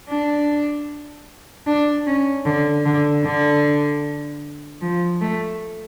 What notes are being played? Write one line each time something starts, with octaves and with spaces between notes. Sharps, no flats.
D4
D4
C#4
D3
D3
D3
F3
A3